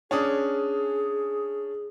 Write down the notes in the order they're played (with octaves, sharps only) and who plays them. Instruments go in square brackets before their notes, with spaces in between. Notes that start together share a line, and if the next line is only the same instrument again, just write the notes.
[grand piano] C#4 D4 D#6 [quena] G#4